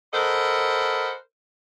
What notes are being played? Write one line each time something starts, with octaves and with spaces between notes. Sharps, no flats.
A4 A#4 C5 D#5 F#5 B5